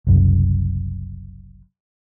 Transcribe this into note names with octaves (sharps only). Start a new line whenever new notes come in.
F#1 C2 F#2